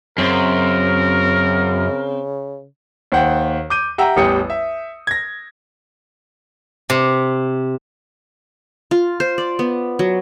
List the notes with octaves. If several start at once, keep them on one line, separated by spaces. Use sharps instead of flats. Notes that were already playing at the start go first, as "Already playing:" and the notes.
F#2 C#3 C4 A#4
D#2 C5 F#5 G5
D6 G6 D#7
G4 E5 F#5 G5 A#5 E6
A1 E2 G3 G5 D#6 C#7
E5
G#6 A#6
C3
F4
C5
D5
B3
F#3